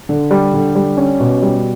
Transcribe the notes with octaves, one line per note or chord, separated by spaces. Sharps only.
D3
G3
D3
G3
C#4
B2
G3